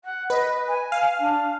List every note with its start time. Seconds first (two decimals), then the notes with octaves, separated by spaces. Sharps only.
0.04 F#5
0.30 B4 D#5
0.67 G#5
0.92 F5
1.19 D4